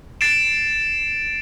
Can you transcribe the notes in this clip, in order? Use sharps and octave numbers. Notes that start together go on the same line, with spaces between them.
A6 C7 D7 E7